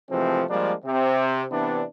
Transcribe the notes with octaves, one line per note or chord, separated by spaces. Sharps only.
C3 E3 F3 G#3 A3 C4
F3 G3 G#3 A#3 D4
C3 C4
C3 E3 B3 D4